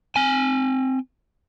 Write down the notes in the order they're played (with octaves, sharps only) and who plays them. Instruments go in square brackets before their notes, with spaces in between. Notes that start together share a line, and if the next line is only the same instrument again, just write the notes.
[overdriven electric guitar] C4 G#5